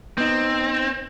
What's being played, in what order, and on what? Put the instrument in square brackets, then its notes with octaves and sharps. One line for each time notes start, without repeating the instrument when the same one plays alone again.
[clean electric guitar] B3 D#4 [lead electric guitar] C4